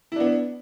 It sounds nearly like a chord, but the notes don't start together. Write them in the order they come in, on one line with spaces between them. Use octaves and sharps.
E4 D4 B3